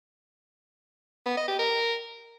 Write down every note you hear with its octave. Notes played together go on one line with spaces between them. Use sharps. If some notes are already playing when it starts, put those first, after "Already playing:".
B3
D#5
G4
A#4